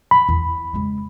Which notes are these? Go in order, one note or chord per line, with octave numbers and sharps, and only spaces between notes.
B5
E2
C#3 G#3